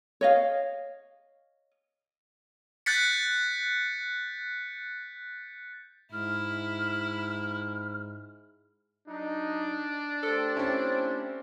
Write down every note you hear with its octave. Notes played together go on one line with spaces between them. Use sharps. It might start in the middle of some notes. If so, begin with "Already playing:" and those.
C#5 D#5 F5
F#6 G6 A6 B6 C#7
G#2 E4 F6
F#3 D4 D#4
A3 G4 A4 C5
C4 C#4 E4